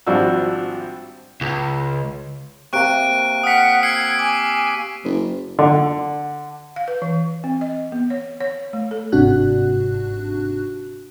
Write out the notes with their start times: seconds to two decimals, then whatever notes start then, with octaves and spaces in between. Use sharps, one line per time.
0.07 G#1 F3 G3 D4 F#4 E6
1.41 C#2
2.73 C3 A#3 C#6 F#6 D7
3.43 F#5 D#6 F6 B6
3.83 E6 G#6 C7 D7
4.19 G#5 D6
5.04 F#1
5.59 D3
6.76 F5
6.88 B4
7.02 E3
7.44 C4
7.61 D#5
7.92 B3
8.10 C#5
8.41 C#5
8.73 A3
8.91 A4
9.12 G1 G#2 C3 D4 F#4 F#6